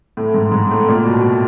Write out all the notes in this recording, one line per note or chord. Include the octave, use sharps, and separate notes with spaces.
A2
G#2
G#2
A2
A#2
B2